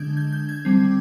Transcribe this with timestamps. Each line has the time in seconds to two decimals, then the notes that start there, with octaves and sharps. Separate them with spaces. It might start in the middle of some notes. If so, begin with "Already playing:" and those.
Already playing: D3 G#3 D4 G6 G#6
0.17 G6
0.32 G6
0.49 G#6
0.65 D3 G3 C4